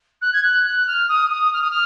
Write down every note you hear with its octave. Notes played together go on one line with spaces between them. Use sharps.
F#6
G#6
F#6
F#6
F6
D#6
D#6
F6
D#6
F6